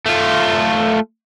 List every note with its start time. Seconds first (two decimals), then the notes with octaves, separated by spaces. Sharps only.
0.06 A3 F4